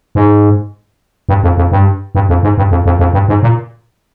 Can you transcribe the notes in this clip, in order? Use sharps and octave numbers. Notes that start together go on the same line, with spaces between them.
G#2
G2
F2
F2
G2
G2
F2
G#2
G2
F2
F2
F2
G2
G#2
A#2